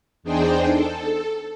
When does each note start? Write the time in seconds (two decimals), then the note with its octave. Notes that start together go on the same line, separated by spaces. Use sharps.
0.23 E2 D4 D#4 G#4 C5 G5
0.69 A4